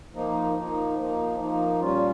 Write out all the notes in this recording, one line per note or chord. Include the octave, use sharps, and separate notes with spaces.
F3 A#3 D#4
F3 A#3 D#4
F3 A#3 D#4
F3 A#3 D#4
A#2 G3 C#4 F4